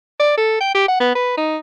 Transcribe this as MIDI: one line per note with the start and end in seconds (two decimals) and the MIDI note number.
0.20 0.37 74
0.37 0.58 69
0.60 0.71 79
0.74 0.85 67
0.88 1.00 78
1.00 1.10 59
1.15 1.34 71
1.37 1.57 63